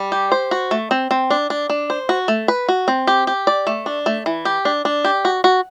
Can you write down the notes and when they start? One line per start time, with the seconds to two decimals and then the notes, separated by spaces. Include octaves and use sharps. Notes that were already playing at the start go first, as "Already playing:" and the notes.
Already playing: G3
0.12 G4
0.32 C5
0.51 F#4
0.71 A3
0.91 C4
1.11 C4
1.31 D4
1.50 D4
1.70 D4
1.90 C5
2.09 F#4
2.28 A3
2.48 B4
2.68 F#4
2.88 C4
3.07 G4
3.27 G4
3.47 D5
3.67 A3
3.86 D4
4.06 A3
4.26 E3
4.45 G4
4.65 D4
4.85 D4
5.05 G4
5.25 F#4
5.44 F#4